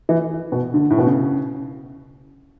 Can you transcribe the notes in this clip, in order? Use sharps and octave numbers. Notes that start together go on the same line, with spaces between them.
E3
B2
D3
A2
B2
C#3